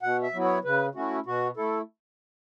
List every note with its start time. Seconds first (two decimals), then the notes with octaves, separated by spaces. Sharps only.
0.02 B2 F#5
0.23 E5
0.34 F#3 B3 E4
0.44 C#5
0.64 C#3 B4
0.95 A3 C#4 E4 F#4
1.26 B2 F#4
1.57 A3 E4 A4